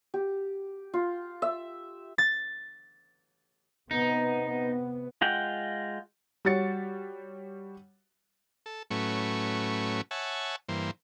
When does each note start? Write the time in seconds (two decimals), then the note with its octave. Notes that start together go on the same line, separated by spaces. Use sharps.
0.14 G4
0.94 F4
1.42 E5
2.18 A6
3.91 C3 B3 D#4
5.21 G#3 F4 F#5 G5
6.45 G3 F#4 C#5 A6 C#7
8.66 A4
8.91 A2 F#3 A3 C#4 B4 C#6
10.11 C#5 E5 F#5 G#5 A5
10.69 G2 E3 A#3 C5